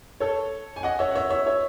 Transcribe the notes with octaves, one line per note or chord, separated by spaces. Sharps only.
A4 C#5
G#5
D#5 F#5
C#5 E5
F#5
C#5 E5
C#5 E5
C#5 E5